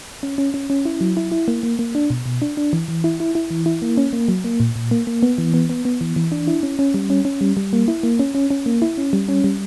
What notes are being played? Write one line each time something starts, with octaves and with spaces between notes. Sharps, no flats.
C#4
C#4
C#4
C#4
E4
F#3
E4
E4
A#3
A#3
A#3
D4
B2
B2
D4
D4
E3
E3
E4
E4
E4
E3
E4
A#3
C#4
A#3
F#3
A#3
A#2
A#2
A#3
A#3
B3
E3
B3
B3
B3
E3
E3
D4
E4
C#4
C#4
G3
C#4
C#4
G3
G3
A#3
E4
A#3
C#4
C#4
C#4
A#3
E4
C#4
G3
C#4
G3